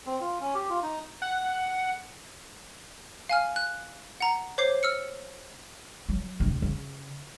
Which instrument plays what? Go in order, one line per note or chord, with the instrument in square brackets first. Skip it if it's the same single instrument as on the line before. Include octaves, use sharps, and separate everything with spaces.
[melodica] C4
F4
C#4
G4
F4
D#4
[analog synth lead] F#5
[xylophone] F5 G#5 F6
F#6
F#5 A#5
C5 C#5 D6 G6 C7
E6 F6 C#7
[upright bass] F#3
D2 C3
C#3